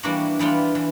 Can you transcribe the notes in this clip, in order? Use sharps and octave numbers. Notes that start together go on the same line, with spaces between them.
E3 G3 A#3 D4 F#4
E3 G3 B3 D4 F4
E3